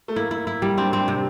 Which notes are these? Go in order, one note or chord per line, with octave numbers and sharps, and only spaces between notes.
A3
A#3 E4
E4
E4
G3
C4 D4
C4
C3